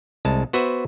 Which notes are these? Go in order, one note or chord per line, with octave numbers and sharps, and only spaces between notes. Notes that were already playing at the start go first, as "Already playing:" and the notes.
C2 G#3 A5
B3 F#4 B4 C5 E5